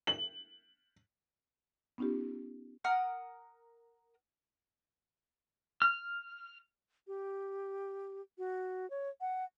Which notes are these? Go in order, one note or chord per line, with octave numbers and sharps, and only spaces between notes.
F#7
B3 C#4 D#4 F4 G4
A#4 F#5 D#6 F6
F6
G4
F#4
C#5
F#5